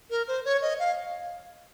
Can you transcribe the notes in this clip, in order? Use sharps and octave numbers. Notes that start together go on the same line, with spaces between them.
A#4
C5
C#5
D#5
F5